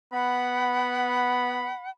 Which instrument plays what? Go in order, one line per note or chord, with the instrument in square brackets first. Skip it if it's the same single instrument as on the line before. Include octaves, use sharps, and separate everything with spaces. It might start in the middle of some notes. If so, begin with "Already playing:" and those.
[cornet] B3 [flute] F#5 [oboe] B5